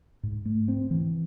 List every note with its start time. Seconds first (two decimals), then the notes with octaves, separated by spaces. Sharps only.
0.23 G#2
0.45 A3
0.68 C4
0.91 E3